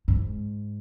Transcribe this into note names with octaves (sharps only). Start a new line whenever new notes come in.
G#2